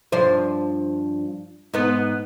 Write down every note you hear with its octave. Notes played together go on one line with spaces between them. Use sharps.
G2 F3 C5
G#2 B3